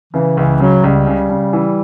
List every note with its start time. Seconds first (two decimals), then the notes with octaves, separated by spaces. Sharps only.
0.13 C#3 E3
0.37 C#2 E3
0.60 C#3 F#3
0.83 C#2 G3
1.07 C#3
1.30 C#3
1.53 E3